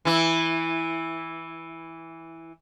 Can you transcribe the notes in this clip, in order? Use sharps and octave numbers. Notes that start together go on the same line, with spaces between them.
E3 E4